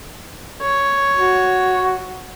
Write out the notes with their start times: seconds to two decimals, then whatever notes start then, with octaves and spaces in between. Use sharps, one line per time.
0.61 C#5
1.16 F#4